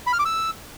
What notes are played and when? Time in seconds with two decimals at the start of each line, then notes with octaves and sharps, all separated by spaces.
0.07 B5
0.13 F6
0.19 D6
0.26 E6